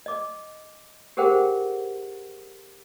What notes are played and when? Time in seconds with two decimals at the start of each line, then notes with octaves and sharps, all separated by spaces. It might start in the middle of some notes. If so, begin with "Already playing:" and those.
0.06 D#5 D6
1.17 G4 G#4 A#4 C5 F#5 G5